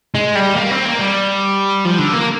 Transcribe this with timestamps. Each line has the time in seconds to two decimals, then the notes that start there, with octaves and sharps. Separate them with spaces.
0.15 G#3
0.35 G3
0.56 A#3
0.71 C4
0.85 A#3
0.99 G3
1.85 F3
1.99 D3
2.13 A#3